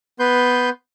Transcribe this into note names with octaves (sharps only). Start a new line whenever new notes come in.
B3 B4 C6 G6